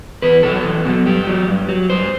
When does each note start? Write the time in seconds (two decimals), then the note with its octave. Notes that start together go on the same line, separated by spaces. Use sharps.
0.22 E2 B4
0.43 B2 F#3 A4
0.64 E2
0.85 B2 F#3
1.06 G2 G4
1.27 F#3
1.48 G2
1.69 F#3
1.90 G2 C5